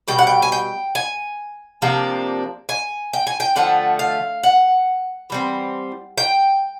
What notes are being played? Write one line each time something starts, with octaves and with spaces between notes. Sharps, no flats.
B2 G3 G5
F#5
G5
G#5
G5
G#5
C3 F3 A#3 D4
G#5
G5
G#5
G5
D3 F3 A3 F#5
F5
F#5
E3 G3 C4
G5